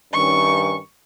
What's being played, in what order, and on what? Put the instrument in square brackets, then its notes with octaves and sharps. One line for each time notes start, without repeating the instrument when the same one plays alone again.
[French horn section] G2 D#3 C#4 [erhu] C#6